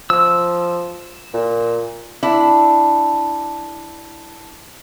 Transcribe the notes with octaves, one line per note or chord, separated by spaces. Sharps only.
F3 E6
A#2
D4 E4